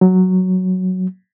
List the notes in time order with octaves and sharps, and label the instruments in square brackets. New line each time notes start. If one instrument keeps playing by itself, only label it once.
[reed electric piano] F#3